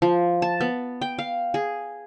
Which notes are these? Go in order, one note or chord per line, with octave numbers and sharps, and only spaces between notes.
F3
A5
B3
G5
F5
G#4